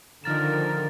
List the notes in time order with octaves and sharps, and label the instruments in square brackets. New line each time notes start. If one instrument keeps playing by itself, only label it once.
[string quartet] D3 [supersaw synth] D#3 F3 A#4 [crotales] F6 A6 E7